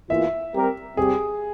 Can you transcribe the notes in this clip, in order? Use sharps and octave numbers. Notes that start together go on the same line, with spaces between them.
E2 E3 A#3 F4 E5
G3 C4 G4 A#4
C3 G3 C4 G4 G#4